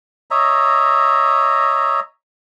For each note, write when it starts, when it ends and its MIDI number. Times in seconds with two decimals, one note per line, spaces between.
0.31 2.00 73
0.31 2.00 75
0.31 2.00 76
0.31 2.00 82